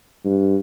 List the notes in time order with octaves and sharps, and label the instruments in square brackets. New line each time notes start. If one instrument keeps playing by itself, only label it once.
[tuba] G2